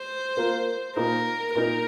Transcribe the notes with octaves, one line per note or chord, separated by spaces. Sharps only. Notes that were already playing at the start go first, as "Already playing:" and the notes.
Already playing: C5
A#3 F4 A#4
A#2 A#3 D#4 A#4
A#2 A#3 D#4 A#4